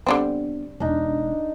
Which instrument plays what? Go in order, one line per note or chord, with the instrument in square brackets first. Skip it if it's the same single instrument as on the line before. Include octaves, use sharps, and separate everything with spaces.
[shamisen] D3 G3 C4 [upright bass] B3 D4
[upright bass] E1 [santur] D4 D#4